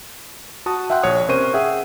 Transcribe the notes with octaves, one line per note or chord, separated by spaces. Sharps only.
F#4 A5 D#6
E5 F#5 G5 C6 F#6
A#1 C#5 D#6
C3 C#4 A#4 C5 C#6 D#7
G#4 E5 F#5 G5